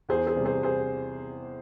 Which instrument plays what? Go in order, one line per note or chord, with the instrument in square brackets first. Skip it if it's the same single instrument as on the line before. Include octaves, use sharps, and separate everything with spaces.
[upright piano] E2 G#4 C5
G#4 C5
C3 G3
G#4 C5
G#4 C5